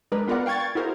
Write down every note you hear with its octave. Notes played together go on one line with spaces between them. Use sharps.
G#3 D4 A#4 B4
B3 F4 A#4 B4 D5 F#5
F5 G5 C#6 G#6 A6
E4 F#4 G#4 A#4 C5